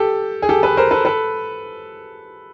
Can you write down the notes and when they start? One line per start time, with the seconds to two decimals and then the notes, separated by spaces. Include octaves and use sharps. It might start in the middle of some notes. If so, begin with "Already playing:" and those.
Already playing: G4 A4
0.42 G#4
0.49 G4 A4
0.63 A4 B4
0.77 A#4 C5
0.91 A4 B4
1.05 A4 B4